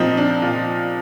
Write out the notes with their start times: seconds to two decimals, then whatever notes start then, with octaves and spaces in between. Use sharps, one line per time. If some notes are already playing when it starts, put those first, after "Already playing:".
Already playing: A#2 F3 C4 D#4
0.17 D4
0.42 A#2 F3